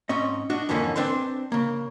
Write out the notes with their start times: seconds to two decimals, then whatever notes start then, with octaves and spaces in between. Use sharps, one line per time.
0.09 G#2 C4 C#4 D#5
0.50 D4 F#4 D#5
0.69 F2 G#2 D3 E3 A#3 C#4
0.96 C4 D4 B4 C5 C6
1.52 C#3 A#3